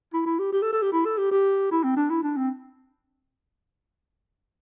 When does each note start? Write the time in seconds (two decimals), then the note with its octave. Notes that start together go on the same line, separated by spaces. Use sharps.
0.13 E4
0.26 E4
0.39 G4
0.52 G4
0.62 A4
0.73 A4
0.82 G4
0.93 E4
1.05 A4
1.18 G4
1.31 G4
1.71 E4
1.84 C4
1.97 D4
2.10 E4
2.23 D4
2.37 C4